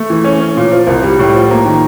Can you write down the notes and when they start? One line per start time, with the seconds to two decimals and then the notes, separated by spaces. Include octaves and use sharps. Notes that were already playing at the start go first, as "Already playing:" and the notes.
Already playing: A3
0.10 E3
0.24 C#4
0.40 C#4
0.57 A#2
0.71 F3
0.87 C2
1.03 G3
1.19 A2
1.34 F3
1.51 A#3
1.66 D#3